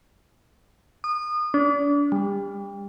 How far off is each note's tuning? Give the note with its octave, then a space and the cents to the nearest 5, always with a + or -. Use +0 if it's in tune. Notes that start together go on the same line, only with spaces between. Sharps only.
D#6 -30
D4 -35
G3 +30